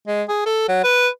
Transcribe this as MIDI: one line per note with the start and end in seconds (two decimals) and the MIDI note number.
0.07 0.23 56
0.29 0.45 68
0.46 0.66 69
0.68 0.80 54
0.84 1.08 71